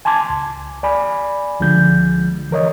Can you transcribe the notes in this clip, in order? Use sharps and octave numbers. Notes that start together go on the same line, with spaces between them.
G#5 A5 C6 D6 G#6
C#2
D5 G#5 B5
C#2 D3 F3 G#3 G6
E3 A#4 C#5 D#5